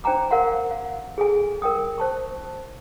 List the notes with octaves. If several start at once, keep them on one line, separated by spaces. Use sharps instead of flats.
D4 C5 G5 G#5 A#5 D6
A#4 F5 F#5 C6
F5
G#4 A4 G#5
A#4 G5 D#6
C5 A5 C#6